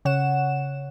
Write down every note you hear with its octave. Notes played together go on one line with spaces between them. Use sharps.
C#3 C#5 F#5 E7